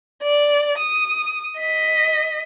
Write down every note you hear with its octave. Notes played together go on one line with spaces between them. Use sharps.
D5
D#6
D#5 B6